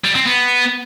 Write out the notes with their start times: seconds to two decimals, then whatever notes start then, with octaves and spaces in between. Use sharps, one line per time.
0.04 G3
0.15 C4
0.26 B3